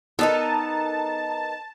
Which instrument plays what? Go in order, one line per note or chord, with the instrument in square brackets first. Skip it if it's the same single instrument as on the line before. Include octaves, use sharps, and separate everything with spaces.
[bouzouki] B3 D#4 A#4 [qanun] A4 [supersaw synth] A5